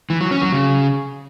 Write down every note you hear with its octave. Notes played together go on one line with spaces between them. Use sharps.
E3
F#3
C#4
F#3
C#3